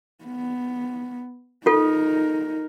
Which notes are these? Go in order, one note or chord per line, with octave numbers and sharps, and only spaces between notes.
B3
D#4 F4 A4 A#4